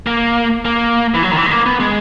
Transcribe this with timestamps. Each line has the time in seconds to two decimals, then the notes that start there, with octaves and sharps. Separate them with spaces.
0.06 A#3
0.65 A#3
1.14 E3
1.23 F#3
1.31 D#3
1.37 E3
1.46 G#3
1.51 A#3
1.66 B3
1.80 G#3